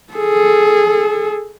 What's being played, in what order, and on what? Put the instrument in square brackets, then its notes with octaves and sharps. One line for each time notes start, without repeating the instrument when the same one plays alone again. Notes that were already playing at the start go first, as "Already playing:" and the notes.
[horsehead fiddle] G#4 A4